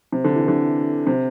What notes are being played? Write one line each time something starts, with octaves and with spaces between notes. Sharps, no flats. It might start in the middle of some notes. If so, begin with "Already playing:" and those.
C3
D3
E3
D3
C3